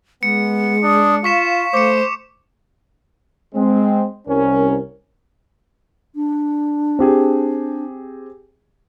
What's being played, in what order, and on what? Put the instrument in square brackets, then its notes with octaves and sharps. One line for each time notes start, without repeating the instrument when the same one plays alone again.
[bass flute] G#3 [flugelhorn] B3 [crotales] C#7
[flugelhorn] D4 [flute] D#6
[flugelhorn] F4 [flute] F5 [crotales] C#6 B6 E7
[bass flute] A3 [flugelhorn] C5 [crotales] D6 C#7
[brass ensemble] G#3 C4
C2 C#4 A#4
[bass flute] D4
[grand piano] C4 G4 G#4